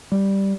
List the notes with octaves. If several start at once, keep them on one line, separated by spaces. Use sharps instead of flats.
G3